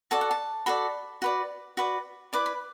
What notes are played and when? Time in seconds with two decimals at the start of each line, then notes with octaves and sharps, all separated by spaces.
0.11 F#4 A4 D5 A5
0.21 F#5
0.31 A5
0.66 F#4 A4 D5 B5
1.22 F#4 B4 D5
1.77 F#4 B4 D5
2.33 E4 B4 D5 D6
2.46 B5